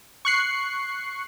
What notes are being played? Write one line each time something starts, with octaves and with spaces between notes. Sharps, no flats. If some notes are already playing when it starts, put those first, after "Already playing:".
C#6 F#6 C7 C#7